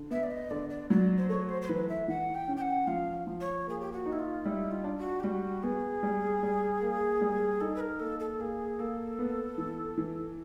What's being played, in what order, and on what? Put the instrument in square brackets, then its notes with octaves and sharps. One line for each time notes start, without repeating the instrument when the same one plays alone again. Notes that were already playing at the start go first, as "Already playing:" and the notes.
Already playing: [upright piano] D3
[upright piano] B3 [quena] E5
[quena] D5
D#5
[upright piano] D3 [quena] D5
[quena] D5
[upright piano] F#3 [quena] D5
[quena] C5
[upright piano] A3 [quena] C#5
[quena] C5
C5
[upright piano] E3 [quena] B4
[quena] E5
[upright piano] E3 [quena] F#5
[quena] G5
[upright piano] C#4
[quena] G5
F#5
[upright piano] F3 [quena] F5
[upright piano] F3
[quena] C#5
[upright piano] A#3 [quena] G#4
[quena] G4
F#4
[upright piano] D#4
[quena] E4
F4
[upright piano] G3 [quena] E4
[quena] F4
[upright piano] D4
[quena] F#4
G4
[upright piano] G3 [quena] F#4
[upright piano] B3 [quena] G#4
[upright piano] G3
G3
A#3
G3
[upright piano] D#4 [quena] A4
[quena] B4
A#4
[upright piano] A#3 [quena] A4
[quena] A4
[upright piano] A#3 [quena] G#4
[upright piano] A#3 [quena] A4
[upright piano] B3
E3
E3